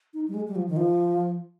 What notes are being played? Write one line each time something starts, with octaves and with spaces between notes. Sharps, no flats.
D#4
G3
G#3
G3
F3
D#3
F3